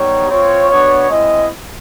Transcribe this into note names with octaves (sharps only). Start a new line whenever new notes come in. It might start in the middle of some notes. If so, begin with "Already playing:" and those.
Already playing: G3 B3 D#4 G4 C#5
C4 F4 C#5
B3 D4 F#4 C#5
G#3 C4 E4 D#5